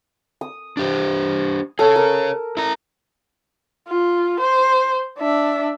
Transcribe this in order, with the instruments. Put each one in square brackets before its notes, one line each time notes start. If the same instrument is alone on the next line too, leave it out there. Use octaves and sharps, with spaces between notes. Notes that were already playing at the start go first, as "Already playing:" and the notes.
[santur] D#6
[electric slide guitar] D4 G4 C5
[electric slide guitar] G#4 C#5 [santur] A4
[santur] A#4
[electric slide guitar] E4 A#5
[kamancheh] F4
C5
D4 E5